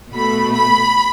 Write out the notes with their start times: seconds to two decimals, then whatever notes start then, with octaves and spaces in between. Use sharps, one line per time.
0.13 B2 A3 B5
0.54 B5